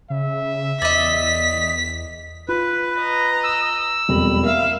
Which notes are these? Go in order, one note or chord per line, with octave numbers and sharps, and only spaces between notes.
C#3 E5
E2 D5 D#5 B6
F4 B4
D#5 A#5
E6
E1 F2 G3 B5
A#3 E5 F5